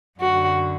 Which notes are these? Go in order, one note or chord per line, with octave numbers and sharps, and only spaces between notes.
F#2 D3 F#4